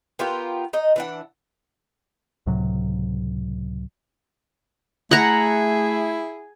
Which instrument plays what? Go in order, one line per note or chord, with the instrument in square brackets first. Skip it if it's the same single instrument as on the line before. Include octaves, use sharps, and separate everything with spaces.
[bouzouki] B3 F4 G4 A#4
D#4 D#5
E3 D4 F#5
[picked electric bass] C#2 A2 C3 F#3
[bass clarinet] A3 [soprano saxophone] E4 [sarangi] G#4 [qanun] F#5 A#5